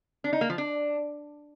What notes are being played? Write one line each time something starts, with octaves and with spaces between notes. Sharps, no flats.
D4
D#4
A#3
F3
D4